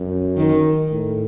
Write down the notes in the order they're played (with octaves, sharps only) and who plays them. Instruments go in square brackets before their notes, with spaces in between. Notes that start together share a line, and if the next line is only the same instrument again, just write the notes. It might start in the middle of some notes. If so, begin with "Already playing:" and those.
Already playing: [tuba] F#2
[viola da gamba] D#3
[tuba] A2